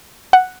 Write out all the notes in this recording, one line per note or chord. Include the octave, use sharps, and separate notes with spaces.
F#5